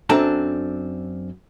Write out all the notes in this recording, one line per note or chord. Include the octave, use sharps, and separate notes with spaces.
F#2 C4 D4 A4 A5 A#5